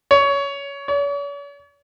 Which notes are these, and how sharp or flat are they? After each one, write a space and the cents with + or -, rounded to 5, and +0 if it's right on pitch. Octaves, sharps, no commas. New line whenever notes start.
C#5 +20
C#5 +45